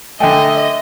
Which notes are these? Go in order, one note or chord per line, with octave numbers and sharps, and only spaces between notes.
D3 A3 D#5 E5 G5 G#5